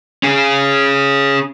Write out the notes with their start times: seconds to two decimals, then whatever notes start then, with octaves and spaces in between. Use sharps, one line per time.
0.23 C#4 G#4